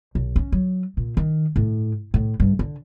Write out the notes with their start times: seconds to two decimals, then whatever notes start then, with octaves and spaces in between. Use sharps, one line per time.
0.15 B1
0.36 C#4
0.52 F#3
0.97 A#2
1.17 D#3
1.56 A2
2.14 A2
2.40 G2
2.59 D3